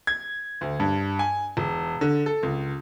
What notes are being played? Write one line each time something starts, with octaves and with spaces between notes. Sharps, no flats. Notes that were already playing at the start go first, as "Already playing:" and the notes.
G#6
D2
G2
G#5
E1
D3
A4
C#2